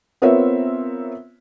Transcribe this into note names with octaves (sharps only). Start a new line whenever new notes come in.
B3 C4 F4 A#4 C#5 E5